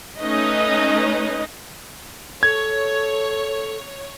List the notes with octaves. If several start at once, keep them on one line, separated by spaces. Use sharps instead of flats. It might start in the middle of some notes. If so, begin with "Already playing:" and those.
A3 C#4 D#4 B4 D#5
A4 C#5 G#6